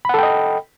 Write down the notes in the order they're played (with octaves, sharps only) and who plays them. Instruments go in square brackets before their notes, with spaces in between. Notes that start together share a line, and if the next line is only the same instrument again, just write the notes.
[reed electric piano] B5
F#5
A4
G5
D#5